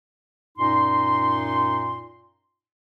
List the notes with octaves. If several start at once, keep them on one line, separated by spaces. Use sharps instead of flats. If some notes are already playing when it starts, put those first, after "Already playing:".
F#2 A#2 D#4 C6